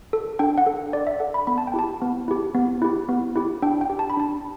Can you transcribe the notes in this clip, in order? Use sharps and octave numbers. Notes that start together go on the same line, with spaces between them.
A4
D4 G5
F#5
A4
D4 D5
E5
A4 F#5
B5
B3 B5
A5
G5
E4 G4 A5
B3
E4 G4
B3
E4 G4
B3
E4 G4
D4 G5
G5
G4
A5
B5
D4 A5